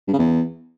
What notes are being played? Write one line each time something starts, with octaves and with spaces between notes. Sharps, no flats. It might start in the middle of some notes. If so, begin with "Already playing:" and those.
G2
C#3
E2